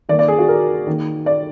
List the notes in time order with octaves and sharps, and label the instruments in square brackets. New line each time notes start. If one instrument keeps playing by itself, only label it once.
[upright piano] D#3 D5
A#3
D5
G#4
F#4
A#4
D#3 A#3
D5